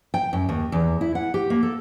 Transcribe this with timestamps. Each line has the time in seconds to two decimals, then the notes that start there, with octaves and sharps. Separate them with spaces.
0.14 G5
0.33 F#2
0.49 D#2
0.72 E2
1.01 E4
1.15 F#5
1.34 G4
1.50 A#3
1.63 A4